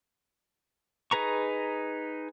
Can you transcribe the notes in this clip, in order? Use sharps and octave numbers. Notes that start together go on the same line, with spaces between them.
D#4 G#4 B4 A#5 C#6